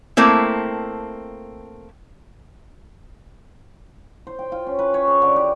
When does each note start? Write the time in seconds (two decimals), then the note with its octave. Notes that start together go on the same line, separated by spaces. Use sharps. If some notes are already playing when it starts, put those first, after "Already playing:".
0.17 A3 A#3 C4 E4
4.27 C5
4.39 G5
4.52 F4
4.67 C#4
4.79 B4
4.94 C#5
5.07 G#4
5.22 D3
5.36 G4